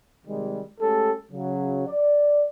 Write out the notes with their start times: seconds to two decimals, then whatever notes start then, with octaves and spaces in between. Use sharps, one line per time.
0.26 C3 D#3 G3 G#3
0.80 G#3 A3 C#4 G4 A4
1.32 C#3 F#3
1.88 D5